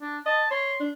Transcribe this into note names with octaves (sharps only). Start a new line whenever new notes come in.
D4
D#5 A5
C#5 C6
D4